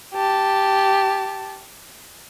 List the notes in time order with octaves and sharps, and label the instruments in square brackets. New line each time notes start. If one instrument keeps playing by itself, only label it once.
[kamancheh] G4 A5